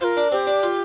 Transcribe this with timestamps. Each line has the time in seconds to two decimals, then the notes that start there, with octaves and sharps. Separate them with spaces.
0.01 F4 A#4 C5
0.17 D4
0.32 C4 G4
0.47 D4
0.63 F4